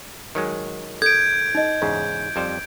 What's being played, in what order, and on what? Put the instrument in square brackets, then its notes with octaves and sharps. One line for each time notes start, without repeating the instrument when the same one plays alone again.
[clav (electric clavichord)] D#3 F#3 G#3
[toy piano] A4 [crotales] G6 D7 [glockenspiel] G#6
[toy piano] D#4 D#5
[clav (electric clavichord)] E2 G#2 C#3
F2 G3 C5